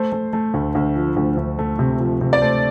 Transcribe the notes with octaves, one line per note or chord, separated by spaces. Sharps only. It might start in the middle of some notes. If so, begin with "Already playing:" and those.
Already playing: A3 C5
A3
A3
D2
D2
F3
D2
D2
A3
C3
F3
C3
D5
A3 C5